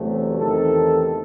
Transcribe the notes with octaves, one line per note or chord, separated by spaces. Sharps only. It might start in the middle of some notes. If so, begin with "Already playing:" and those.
Already playing: E2 C3 F#3 A3
E2 C3 D#3 A3 A4